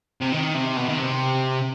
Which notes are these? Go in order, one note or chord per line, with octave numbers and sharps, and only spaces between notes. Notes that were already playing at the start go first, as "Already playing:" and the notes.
C3
D#3
C3
B2
D#3
C3